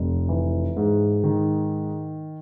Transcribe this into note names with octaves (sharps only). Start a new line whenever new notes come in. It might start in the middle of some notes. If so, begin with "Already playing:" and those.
Already playing: F1
E3
G#2
D#3